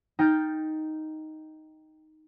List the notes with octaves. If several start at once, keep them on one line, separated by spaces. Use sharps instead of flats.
D#4 G5 F6 G6 A6